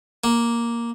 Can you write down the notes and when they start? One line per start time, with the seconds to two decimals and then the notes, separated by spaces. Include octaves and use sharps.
0.24 A#3